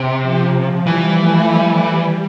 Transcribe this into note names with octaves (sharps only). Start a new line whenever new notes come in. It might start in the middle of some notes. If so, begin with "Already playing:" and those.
Already playing: C3
F3
F3
E3 G3
A3
G3